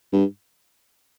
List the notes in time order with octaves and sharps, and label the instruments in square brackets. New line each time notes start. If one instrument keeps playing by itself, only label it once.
[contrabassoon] G2